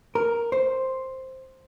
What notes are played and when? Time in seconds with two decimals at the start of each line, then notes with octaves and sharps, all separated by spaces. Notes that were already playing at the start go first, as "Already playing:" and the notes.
0.15 A#4
0.52 C5